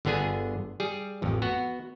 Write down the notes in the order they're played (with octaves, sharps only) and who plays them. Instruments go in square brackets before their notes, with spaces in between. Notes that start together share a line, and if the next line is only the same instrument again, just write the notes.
[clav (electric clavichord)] G1 D3 B3 D4 G#4 G#5
G3 G#4
A1 F2
B3 F#4